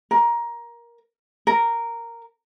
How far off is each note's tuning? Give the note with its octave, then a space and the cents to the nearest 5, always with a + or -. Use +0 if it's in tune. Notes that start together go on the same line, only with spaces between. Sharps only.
A#4 +15
A#4 -5